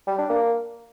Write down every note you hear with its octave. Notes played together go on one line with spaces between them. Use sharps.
G3
D4
A#3